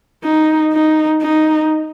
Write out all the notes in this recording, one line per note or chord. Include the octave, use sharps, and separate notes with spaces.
D#4
D#4
D#4